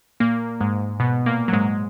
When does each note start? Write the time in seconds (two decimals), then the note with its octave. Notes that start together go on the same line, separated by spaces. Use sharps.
0.20 A#2 A#3
0.60 G#2 G#3
1.00 B2 B3
1.26 A#2 A#3
1.48 F#3
1.53 G#2 G#3